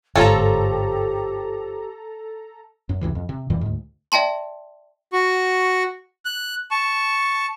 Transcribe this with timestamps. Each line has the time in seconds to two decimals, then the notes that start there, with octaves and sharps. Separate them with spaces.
0.16 G1 G#2 F3 C#4 G4 A4 A#5
2.89 F#2
3.01 C#2 F#2 C3 E3
3.15 F2
3.29 C3
3.50 F2 A#2 E3 G3
3.61 D2 G#2
4.12 D5 E5 G5 A5 C6
5.13 F#4 C#6
6.25 F#6
6.71 A5 C#6